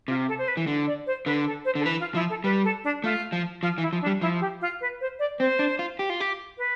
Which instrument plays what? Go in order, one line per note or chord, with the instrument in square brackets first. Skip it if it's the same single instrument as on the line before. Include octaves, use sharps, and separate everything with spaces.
[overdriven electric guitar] C3 [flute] F4
[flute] A4
C5
B4
[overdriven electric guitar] E3
D3
[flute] D5
C5
[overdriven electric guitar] D3 [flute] B4
[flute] A4
C5
[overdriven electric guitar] D3
[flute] A4
[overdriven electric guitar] E3 [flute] B4
[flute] F4
[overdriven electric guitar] F3 [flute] E4
[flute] A4
[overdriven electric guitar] G3 [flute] B4
[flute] A4
D4
[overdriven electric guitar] A3 [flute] F4
[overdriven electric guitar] F3
[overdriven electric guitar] F3 [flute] F4
[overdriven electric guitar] E3
[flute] E4
[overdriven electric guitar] F3
[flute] D4
[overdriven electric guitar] G3
[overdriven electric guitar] F3 [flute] E4
[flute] G4
F4
B4
C5
D5
[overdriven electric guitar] C4 [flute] C5
[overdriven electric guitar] D4
F4
G4
F4
G4
[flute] B4